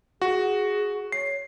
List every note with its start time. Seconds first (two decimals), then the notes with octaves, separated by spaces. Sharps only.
0.22 F#4 G#4
1.12 C#5 C7